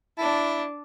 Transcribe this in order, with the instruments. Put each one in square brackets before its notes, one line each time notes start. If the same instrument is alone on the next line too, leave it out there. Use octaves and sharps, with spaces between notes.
[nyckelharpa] D4 A5 [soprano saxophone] E4